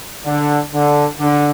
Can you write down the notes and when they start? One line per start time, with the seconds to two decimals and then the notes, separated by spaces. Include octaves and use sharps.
0.25 D3
0.72 D3
1.19 D3